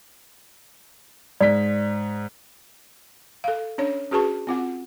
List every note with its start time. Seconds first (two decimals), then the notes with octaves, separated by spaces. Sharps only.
1.41 G#2 D5 B6
3.44 A4 F5
3.78 C#4 D4 C#5
4.11 C#4 F#4 G#4 B4 A5 C#6
4.47 C4 F4 F#5